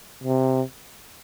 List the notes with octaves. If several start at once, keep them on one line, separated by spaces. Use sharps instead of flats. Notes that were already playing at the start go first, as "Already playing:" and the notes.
C3